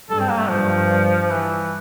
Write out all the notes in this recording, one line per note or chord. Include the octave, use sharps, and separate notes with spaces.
G2 A4
C4
A#3
A3
G2 F3
E3